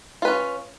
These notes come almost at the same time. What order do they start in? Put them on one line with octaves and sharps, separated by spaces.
F4 B4 C#4